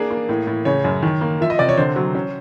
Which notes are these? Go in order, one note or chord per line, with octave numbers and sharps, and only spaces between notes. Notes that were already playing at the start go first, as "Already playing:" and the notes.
Already playing: A#3 D4 G#4
A#3
A2
A2
C#3 C#5
F#2
D#3
A#3
F3 E5
D#5
C3 D5
C#5
D3 C5
F#3
C#4